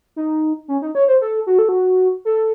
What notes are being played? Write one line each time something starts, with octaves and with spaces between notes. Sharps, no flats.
D#4
C#4
D#4
C#5
C5
A4
F#4
A4
F#4
A4